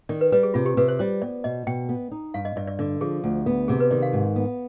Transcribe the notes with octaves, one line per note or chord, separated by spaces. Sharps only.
D#3 D5
B4
G3 B4
G#4
C3 F4
G4
C3 B4
C5
G3 C5
B3 D5
B2 D#5
B2 G5
B3
D#4
G2 F5
D#5
G2 D5
D5
D3 D5
F3 G#4
D2
B3
C3 G#4
B4
D#3 D5
F5
G#2
B3